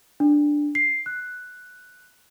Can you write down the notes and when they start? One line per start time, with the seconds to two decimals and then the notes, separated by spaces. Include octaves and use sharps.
0.20 D4
0.75 C7
1.06 F#6